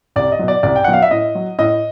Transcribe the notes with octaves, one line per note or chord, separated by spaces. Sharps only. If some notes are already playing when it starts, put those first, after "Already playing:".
C2 D5
D#5
B2 F#3
D5
C2 D5
G5
B2 F#3 F#5
F5
E5
A2 D#5
F#3
A2 D#5